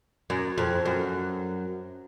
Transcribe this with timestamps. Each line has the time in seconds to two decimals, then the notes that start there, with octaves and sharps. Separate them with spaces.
0.30 F#2
0.58 F2
0.85 F#2